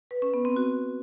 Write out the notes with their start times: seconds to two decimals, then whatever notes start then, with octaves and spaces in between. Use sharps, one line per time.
0.11 B4
0.22 C#4
0.34 B3
0.45 C4
0.56 F#4